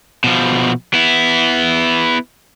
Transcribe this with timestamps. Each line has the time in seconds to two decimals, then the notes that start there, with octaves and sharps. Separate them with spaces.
0.24 B2 F3
0.94 B3 E4